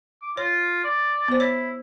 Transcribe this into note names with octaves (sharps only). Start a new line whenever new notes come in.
D6
F4 C#5
D5
B3 C5
E4 C#5